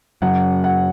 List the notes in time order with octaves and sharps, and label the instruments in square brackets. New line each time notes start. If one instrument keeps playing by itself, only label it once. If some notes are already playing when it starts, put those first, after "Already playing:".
[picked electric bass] F#2 C#3 F#3 [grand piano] F#5
[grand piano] F#5